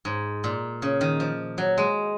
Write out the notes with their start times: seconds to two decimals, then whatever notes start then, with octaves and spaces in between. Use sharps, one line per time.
0.05 G#2
0.44 A#2
0.82 C#3
1.01 D#3
1.20 F3
1.58 F#3
1.78 G#3